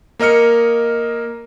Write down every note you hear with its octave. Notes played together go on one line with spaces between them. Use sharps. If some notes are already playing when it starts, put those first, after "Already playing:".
A#3 A#4 D#5 F6 C#7